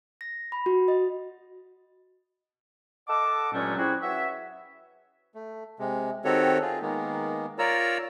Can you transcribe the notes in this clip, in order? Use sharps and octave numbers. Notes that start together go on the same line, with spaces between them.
A#6
B5
F#4
D#5
A4 D#5 F#5 A5 D6
G2 A#2 F#3 G#3 A3 C#4
C4 C#4 E4 F#4 G#4
F#4 B4 C#5 E5
A3
C3 G#3
D#3 C4 F#4 G4 A4 C#5
F4 G#4
D#3 G#3 A#3 B3
F4 A#4 C#5 D5 A#5 E6